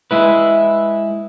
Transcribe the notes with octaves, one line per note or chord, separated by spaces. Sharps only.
G#3 E4 B4